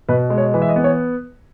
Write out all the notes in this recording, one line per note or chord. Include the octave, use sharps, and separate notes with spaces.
B2 B4
G#3
C#5
E3 B4
E5
D#5
B3
C#5